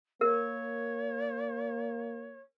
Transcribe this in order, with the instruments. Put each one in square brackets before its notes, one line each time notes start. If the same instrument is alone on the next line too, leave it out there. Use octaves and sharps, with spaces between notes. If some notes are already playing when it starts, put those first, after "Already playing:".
[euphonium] A#3 [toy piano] A#4 [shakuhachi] C#5